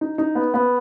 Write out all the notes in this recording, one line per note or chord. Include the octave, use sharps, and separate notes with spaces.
D#4
D#4
B3
B3